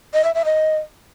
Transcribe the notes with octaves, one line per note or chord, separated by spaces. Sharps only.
D#5
E5
E5
D#5